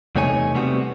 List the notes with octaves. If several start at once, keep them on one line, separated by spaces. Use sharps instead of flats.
E2 C3 A3 D#4 C#5 G#5
C3 G3 A3 B3 C4 F#4